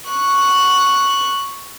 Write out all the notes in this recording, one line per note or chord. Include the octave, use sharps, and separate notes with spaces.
C#6 F#6